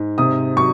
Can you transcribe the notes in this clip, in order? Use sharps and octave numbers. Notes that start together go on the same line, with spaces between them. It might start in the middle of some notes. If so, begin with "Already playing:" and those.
Already playing: G#2
C3 D#6
F#3 C#6